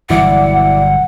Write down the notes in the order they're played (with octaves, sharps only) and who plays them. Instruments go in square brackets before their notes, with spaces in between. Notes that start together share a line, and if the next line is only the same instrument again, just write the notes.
[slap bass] G1 B2 F#3 [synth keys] E3 E4 D5 [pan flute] F#5